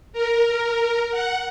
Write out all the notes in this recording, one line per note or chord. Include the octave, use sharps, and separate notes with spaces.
A#4
F#5